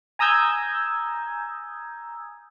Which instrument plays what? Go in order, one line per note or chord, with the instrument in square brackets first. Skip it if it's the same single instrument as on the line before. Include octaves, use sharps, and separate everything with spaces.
[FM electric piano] G#5 A#5 D#6 E6 G6 G#6